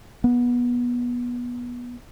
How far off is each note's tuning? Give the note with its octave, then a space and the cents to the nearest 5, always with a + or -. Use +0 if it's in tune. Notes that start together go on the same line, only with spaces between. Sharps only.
B3 -20